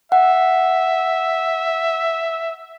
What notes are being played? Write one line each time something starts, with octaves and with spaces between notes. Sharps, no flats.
E5 F#5